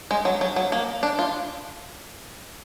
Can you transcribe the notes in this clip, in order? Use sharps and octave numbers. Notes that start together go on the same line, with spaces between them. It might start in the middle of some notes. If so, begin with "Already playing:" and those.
G#3
F#3
F#3
F#3
A#3
D4
F4